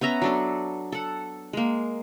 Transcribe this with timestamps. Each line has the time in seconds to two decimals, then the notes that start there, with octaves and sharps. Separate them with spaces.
0.01 B3 C#4 E5 A#5
0.22 F#3 D4 A4
0.92 A4 F#5
1.53 G#3 A#3